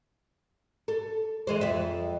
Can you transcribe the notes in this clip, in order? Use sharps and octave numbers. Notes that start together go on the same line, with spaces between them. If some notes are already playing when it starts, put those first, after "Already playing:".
A4
E3 G#3 C5
F2 E5